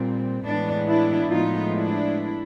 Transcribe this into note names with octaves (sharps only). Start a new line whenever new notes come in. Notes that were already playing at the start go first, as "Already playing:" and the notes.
Already playing: A#2 G3 C4
A2 E3 G#3 B3 D4
D4 E4
A2 F3 G#3 B3 D#4 F4
D4 E4